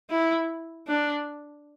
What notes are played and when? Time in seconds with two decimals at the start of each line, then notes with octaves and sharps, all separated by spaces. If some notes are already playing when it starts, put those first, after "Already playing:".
0.10 E4
0.87 D4